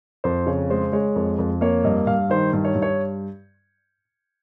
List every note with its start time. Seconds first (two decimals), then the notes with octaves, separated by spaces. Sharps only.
0.24 F2 C5
0.46 C#3 C#5
0.70 G#3 C5
0.92 G#3 C#5
1.16 F2
1.39 F2
1.61 A#3 C#5
1.84 G2 D#5
2.07 G2 F5
2.30 D#3 C5
2.53 G2
2.65 C#5
2.75 G2
2.82 C#5